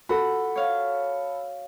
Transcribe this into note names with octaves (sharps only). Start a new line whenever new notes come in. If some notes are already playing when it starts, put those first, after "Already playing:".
F#4 A4 B5
C#5 F5